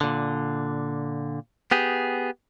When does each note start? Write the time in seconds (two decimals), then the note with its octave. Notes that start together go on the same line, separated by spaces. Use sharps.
0.01 A#2 D3
1.71 B3 G4 G#4